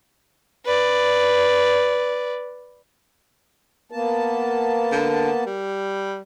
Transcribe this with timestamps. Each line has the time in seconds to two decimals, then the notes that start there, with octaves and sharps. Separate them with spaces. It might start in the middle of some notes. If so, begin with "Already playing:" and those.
0.65 B4 D5
3.92 A#3 B3 A#4 A5
4.92 D3
5.46 G3